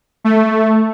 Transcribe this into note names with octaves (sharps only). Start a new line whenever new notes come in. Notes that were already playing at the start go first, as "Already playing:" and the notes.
A3